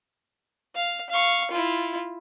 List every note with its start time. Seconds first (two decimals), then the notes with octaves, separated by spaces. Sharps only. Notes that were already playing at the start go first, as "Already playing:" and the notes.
0.75 F5
1.10 F5 C#6
1.51 E4 F4